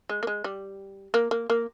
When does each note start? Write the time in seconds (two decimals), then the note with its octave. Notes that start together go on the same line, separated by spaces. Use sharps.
0.09 G#3
0.23 A#3
0.27 G#3
0.44 G3
1.14 A#3
1.31 A#3
1.50 A#3